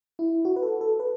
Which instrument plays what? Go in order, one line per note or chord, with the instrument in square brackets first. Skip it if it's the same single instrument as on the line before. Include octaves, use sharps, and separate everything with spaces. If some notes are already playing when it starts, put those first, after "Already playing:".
[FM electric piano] E4
F#4
B4
A4
A4
B4